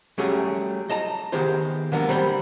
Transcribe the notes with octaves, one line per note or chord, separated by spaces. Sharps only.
F#3 G3 A3 C#4 G4 G#4
D#5 A5 A#5
D#3 B3 G4 G#4 C5
D3 F#3 G#3 A#3 B3 D4
F#3 G3 C5 D5 B5